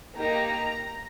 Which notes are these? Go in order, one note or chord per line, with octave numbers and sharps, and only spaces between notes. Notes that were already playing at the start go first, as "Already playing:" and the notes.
A#3 D#4 G4 A#5